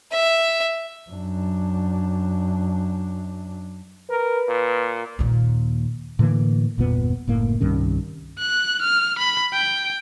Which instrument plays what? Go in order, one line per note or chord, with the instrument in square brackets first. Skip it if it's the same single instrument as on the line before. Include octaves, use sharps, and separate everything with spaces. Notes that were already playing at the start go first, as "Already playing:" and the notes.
[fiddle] E5
[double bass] F#2 D4
[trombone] A#4 [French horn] B4
[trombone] A#2
[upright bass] D#2 A#2
[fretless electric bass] A2 D3 E3 A#3
G1 E2 A#2 B3
F#1 A2 A#3
C2 G2 D#3 C#4
[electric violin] F#6
F6
B5
G5